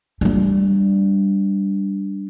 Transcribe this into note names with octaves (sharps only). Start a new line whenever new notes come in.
G3 D4